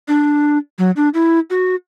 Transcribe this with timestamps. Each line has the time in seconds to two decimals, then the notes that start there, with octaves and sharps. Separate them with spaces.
0.08 D4
0.78 F#3
0.96 D4
1.14 E4
1.50 F#4